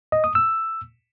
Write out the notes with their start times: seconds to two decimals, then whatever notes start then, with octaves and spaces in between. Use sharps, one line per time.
0.12 D#5
0.24 D#6
0.35 E6